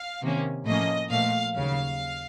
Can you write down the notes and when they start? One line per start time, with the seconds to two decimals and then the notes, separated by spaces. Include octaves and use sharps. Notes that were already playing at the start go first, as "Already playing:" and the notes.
Already playing: F5
0.22 C3 D#3 A#3 C#4
0.66 A2 F3 A#3 C#4 D#5
1.10 A#2 F3 A3 F5
1.55 D#2 C#3 F#3 F5